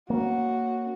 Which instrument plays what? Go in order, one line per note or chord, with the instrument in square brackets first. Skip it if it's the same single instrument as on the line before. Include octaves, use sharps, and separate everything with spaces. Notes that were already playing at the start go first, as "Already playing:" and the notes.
[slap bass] A#3 C#4 [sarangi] F#4